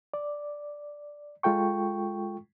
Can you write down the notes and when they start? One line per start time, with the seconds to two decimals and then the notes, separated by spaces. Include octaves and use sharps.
0.14 D5
1.43 G#3 F4 A4 G5 C#6